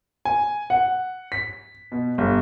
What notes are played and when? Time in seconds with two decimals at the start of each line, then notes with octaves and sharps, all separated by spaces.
0.25 G#5
0.70 F#5
1.32 B6
1.92 B2
2.18 G1